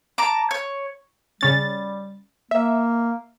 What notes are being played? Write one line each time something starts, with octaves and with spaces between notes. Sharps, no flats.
A5 A#5 D6
C#5
C#3 G3 C#4 A6
A#3 E5